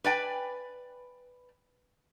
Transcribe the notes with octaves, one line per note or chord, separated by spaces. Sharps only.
B4 D5 G5 G#5